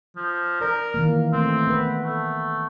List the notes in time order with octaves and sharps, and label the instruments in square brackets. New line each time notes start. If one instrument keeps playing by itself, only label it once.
[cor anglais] F3
[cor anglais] A#4 [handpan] D5
[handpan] D#3 E3 A#3
[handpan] A3 [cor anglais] C4
[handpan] B3 B4
[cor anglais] A3